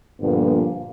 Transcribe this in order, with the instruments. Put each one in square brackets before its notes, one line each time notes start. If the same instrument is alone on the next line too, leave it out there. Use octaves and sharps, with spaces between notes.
[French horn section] G2 A#2 D3 F3 A#3 B3